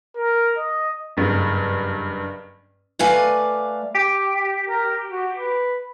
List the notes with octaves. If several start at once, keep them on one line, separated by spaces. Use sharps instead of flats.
A#4
D#5
F#1 G2
A3 B4 D5 F5 G#5
G4
A#4
F#4
B4